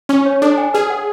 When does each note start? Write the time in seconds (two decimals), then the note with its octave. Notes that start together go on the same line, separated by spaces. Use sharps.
0.09 C#4 C#6
0.26 C#5
0.42 D4 A4
0.58 G#5
0.74 G#4 B4
0.90 F#5